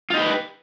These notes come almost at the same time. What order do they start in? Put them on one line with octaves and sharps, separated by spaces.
F4 D#4 G4 B4